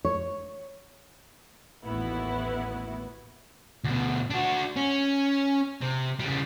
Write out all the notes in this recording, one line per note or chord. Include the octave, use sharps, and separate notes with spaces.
C#5
A1 D#2 B3 E4 F#4
D2 B2
D4 F#4
C#4
C3
C#3 G3